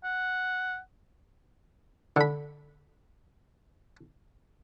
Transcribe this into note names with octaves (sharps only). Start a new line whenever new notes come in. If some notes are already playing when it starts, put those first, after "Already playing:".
F#5
D3 B5